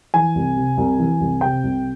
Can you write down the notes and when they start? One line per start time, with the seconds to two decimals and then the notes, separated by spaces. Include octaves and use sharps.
0.14 E3 G#5
0.35 C2
0.57 C3
0.77 C2
0.99 E3
1.20 C2
1.41 C3 G5
1.63 C2